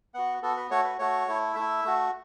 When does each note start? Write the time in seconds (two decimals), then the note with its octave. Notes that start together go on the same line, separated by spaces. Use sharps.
0.14 B3 F#4 F#5
0.42 B3 F#4 A4
0.57 B4
0.70 A3 F#4 C#5
0.85 B4
0.99 A3 F#4 C#5
1.27 A3 E4
1.55 A3 E4 E5
1.85 A3 F#4